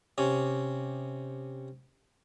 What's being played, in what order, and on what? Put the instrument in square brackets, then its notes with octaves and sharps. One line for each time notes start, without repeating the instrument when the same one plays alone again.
[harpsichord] C3 C#4